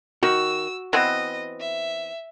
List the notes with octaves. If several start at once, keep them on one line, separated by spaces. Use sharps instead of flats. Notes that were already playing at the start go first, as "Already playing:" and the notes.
D#3 F#4 E6
E3 B3 C4 D#5
E5